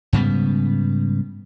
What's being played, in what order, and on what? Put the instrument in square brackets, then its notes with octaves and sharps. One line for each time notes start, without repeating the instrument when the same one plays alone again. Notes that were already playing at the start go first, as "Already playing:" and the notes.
[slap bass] G#2 C#3 G3 B3